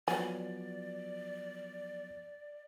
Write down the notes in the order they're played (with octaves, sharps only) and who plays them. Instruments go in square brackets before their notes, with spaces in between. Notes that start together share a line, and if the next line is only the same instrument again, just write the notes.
[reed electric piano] F3 F#3 B3 [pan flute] D5 [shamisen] G#5